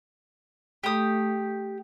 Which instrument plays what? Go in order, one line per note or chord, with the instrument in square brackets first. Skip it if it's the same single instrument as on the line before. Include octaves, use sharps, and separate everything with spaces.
[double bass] A3 [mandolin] G4 D#6